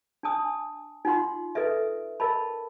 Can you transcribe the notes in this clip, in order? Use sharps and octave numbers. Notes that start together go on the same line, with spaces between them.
D4 G#5 A5 D#6
D#4 F4 F#5 C6
A4 B4 D#5 E5
A#4 D#5 A5 B5